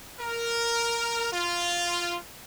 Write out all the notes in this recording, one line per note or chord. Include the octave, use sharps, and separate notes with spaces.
A#4
F4